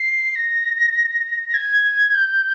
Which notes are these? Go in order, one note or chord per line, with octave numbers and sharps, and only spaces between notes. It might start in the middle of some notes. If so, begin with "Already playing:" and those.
Already playing: C7
A#6
A#6
G#6
G6